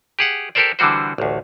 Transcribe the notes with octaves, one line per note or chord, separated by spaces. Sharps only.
G4 G#4 F#5
G4 A4 A#4 C5 D5
D3 E3 G3 F#4 C5
A1 D2